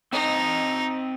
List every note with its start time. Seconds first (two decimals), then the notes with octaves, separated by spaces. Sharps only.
0.13 C4 D#4 D#5